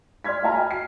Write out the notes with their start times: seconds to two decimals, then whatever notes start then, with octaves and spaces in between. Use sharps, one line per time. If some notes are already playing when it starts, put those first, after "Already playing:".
0.24 D5 C6 F6 G#6 B6
0.43 D#5 F5 A5 A#5 F6
0.54 D#5 G5 G#5 B5
0.71 C7